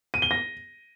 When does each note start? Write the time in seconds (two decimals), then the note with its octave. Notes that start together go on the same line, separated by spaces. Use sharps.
0.14 D#7
0.22 G7
0.31 A#6